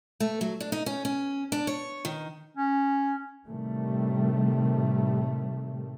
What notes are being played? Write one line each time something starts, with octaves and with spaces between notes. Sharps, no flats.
A3
F#3
D4
D#4
C#4
C#4
D4
C#5
D#3
C#4
A2 C3 D#3 G3 A3